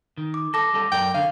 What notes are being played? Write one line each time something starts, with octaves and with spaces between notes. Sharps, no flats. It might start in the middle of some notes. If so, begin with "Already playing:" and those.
D#3
D6
A4 D6 A#6
G3 C#4 A4
F#2 A#4 D5 G5
D3 C#4 F5